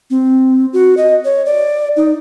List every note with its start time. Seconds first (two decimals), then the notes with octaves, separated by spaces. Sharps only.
0.10 C4
0.73 F#4
0.97 D#5
1.25 C#5
1.46 D5
1.97 D#4